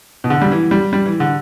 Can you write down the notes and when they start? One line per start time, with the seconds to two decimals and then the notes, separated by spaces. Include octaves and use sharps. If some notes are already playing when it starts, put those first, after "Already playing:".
0.24 B2
0.30 D3
0.42 G3
0.51 E3
0.71 G3
0.93 G3
1.06 E3
1.20 D3